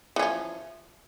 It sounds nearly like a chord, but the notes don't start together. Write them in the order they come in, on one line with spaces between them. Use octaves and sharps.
E3 C#4 F3